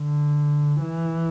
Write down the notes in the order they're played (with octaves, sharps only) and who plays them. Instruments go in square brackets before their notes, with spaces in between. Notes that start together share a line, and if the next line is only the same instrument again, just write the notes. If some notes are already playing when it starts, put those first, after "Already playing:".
Already playing: [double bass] D3
E3